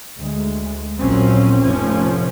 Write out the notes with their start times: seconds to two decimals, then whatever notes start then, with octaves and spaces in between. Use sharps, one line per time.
0.17 D2 G#3
0.99 A#1 A#2 F#3 A#3 C4 C#4
1.63 F1 A2 F3 C#4